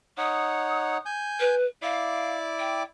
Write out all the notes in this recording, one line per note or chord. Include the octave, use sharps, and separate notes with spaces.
D#4 C#5 F#5 D#6
G#5 G6
B4
E4 D5 F5 D6
G5